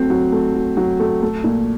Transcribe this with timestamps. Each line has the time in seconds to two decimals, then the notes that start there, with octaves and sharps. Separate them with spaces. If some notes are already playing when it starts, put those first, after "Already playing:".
Already playing: F#3 A3 C4
0.10 F#3
0.32 A3
0.55 F#3
0.77 F#3
1.00 A3
1.22 A3
1.44 A#2